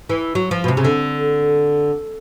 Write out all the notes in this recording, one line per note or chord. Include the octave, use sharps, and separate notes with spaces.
E3
F#3
F3
B2
C3
C#3
D3